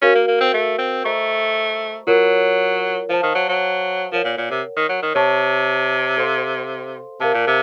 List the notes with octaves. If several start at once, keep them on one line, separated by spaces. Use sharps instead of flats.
C#4 F#4 A#4 F5
A#3
A#3
C4
A3
C4
A3 C5 D#5 A#5 C#6
F#3 F4 A#4 C#5
F3 C5 F5 A5
D#3
F#3
F#3
F3 A#4 C#5 F#5
A#2
A#2
C3
D#3
F#3
D#3
C3 C#5 A5 C#6
A4 C5 F5 C6
C3 A#4 F5 A5
A#2
C3